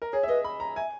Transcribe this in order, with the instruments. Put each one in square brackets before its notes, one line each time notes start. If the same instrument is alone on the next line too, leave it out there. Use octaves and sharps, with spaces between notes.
[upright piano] A#4
[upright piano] G#4 [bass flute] C#5
[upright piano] E5
[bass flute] B4 [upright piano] D#5
[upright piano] B5
A#5
[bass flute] E5 [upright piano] G#5